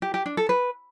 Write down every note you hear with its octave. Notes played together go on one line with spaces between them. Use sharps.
G4
G4
D4
A4
B4